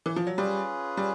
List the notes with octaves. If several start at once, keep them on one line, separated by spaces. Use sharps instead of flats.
E3
F3
F#3
G3 C#4 F4 G#4 B4
G3